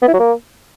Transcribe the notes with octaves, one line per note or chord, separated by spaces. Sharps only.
B3
E4
F#3
A#3